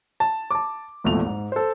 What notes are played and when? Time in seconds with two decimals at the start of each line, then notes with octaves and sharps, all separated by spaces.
0.20 A5
0.51 A5 D6
1.04 G#1 E2 A#2 A3 F7
1.26 G#2
1.52 A4 C5